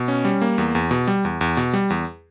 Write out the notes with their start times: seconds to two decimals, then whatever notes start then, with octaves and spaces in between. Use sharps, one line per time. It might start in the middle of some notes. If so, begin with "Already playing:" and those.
Already playing: B2
0.08 C#4
0.25 G3
0.42 A#3
0.58 E2
0.75 E2
0.91 B2
1.08 G3
1.25 E2
1.41 E2
1.57 B2
1.73 G3
1.90 E2